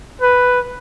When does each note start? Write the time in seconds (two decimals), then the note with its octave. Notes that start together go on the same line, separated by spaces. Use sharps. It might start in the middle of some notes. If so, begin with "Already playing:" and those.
0.21 B4